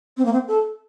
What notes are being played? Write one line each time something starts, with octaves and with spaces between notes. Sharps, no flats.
C4
A#3
C4
A4